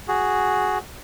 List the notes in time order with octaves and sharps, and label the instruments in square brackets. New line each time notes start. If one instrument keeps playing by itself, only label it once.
[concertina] F#4 G#4